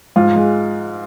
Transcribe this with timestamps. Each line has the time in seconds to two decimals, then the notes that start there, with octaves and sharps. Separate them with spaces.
0.16 G#2 F4
0.36 G#3